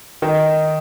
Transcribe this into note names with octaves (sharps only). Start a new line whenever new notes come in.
D#3 D#4